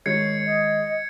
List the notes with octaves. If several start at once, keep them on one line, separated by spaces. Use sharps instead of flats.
D#3 G#3 C#5 G#6 C7 C#7
D#5